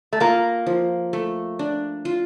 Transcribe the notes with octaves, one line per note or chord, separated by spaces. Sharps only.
A3
A#3 F4
F3
A3
D4
F4